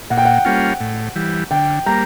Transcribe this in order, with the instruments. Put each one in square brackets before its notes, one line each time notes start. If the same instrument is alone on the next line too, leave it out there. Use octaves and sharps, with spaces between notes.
[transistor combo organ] A#2 [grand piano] F#5
[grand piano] G5
F#5
[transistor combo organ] G3 A#3 C#4 F4
A2
E3 G3
[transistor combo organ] D3 [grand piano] G5
[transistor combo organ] G3 A#3 [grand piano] A#5